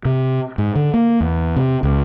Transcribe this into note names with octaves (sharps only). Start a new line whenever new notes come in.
C3
G#2
D3
A#3
E2
C3
C#2